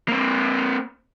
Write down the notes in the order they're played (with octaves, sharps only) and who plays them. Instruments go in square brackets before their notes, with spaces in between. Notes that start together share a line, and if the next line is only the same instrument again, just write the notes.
[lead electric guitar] A#3 C4